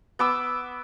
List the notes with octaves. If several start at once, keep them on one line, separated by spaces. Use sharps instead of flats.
B3 D6 E6